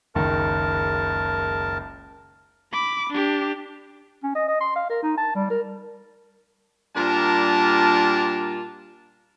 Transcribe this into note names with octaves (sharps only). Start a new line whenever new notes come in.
F#1 C#2 D#3 A#4 A5
B5 D6
D4 G4
C#4
D#5
D#5
C6
F5
A#4
D#4
A5
G3
A#4
A#2 G3 D4 F4 A#4 A5